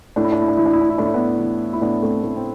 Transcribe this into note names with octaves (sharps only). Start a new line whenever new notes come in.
A2 D4
E4
D4
E4
D4
E3 E4
D4
E4
D4
E4
A2 D4
E4
B3 D4
E3
E4
A2 B3 D4
A3 C4
A2 A3
C4